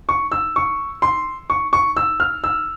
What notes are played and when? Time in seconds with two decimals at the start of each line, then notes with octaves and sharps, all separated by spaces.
0.09 C#6
0.32 E6
0.56 C#6
1.02 C6
1.50 C#6
1.73 C#6
1.97 E6
2.20 F6
2.44 E6